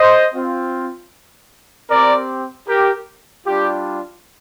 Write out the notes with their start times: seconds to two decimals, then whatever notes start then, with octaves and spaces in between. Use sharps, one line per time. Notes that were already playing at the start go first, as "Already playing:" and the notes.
Already playing: C5 D#5
0.34 C4 F4
1.89 C4 G4 A#4 D5
2.67 G4 A#4
3.45 G3 D4 F4 G4